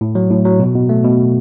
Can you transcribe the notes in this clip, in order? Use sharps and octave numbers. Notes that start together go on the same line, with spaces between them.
A2
F#3
A2
F#3
B2
B2
A3
B2